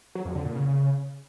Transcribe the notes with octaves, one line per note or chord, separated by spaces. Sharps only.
F#3
F2
D3
A#2
C#3